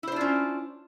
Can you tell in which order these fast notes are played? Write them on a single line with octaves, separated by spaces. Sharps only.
E4 C5 D4 F4 C#4